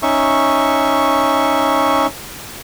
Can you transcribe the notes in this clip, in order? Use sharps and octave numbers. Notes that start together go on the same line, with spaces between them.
C#4 D#4 E5 C#6